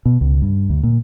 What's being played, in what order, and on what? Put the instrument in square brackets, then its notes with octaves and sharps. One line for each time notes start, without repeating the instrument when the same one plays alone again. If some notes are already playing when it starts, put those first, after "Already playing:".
[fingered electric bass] B2
C#2
G2
D2
A#2